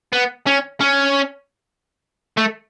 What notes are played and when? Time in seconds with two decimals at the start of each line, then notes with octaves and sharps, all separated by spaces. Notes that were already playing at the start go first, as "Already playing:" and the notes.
0.13 B3
0.47 C#4
0.81 C#4
2.37 A3